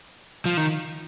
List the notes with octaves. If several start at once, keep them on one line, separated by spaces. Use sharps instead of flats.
F3
D#3